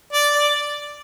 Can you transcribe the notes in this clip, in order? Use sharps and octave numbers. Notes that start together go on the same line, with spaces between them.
D5
D5